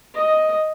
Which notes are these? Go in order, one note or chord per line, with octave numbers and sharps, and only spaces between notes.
D#5